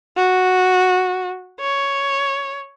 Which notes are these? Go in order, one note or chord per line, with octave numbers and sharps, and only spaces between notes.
F#4
C#5